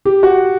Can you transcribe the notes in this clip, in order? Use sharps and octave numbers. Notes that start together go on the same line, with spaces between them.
G4
F#4